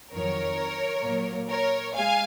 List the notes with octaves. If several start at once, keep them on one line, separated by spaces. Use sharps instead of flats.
F2 D#3 F#3 A#4 C#5
A#2 F#3 A#3
A#4 C#5
G#3 F5 G#5